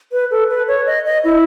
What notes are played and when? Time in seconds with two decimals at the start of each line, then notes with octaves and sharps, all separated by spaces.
0.12 B4
0.31 A4
0.49 B4
0.68 C#5
0.87 D#5
1.05 D#5
1.24 E4